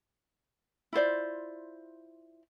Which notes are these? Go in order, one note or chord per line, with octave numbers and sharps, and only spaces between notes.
E4 F4 C5 D5